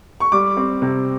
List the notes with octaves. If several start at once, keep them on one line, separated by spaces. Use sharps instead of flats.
C#6
G3 D6
C4
C3